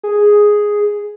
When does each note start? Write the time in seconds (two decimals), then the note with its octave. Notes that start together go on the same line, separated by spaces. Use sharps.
0.04 G#4